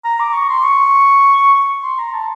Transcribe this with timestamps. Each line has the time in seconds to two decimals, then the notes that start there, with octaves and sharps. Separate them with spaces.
0.05 A#5
0.20 D6
0.34 C#6
0.49 C6
0.64 C#6
1.83 C6
1.99 A#5
2.13 A5